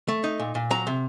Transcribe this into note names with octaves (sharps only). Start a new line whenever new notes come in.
A3
D#4
A#2
A#2
F#3 A#5
C3